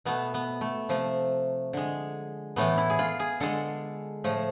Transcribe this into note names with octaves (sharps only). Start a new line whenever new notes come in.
B2 A3 B3
B3
A3
C3 F3 A3
D3 G#3
A2 E3 A3 B3
E4
G#4
F4
G#4
D3 G#3 A4
A2 F3 A3